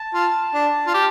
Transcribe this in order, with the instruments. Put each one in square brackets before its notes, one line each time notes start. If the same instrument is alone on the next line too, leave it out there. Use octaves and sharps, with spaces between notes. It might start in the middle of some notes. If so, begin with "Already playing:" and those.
Already playing: [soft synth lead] A5
[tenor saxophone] F4
D4
F4
G4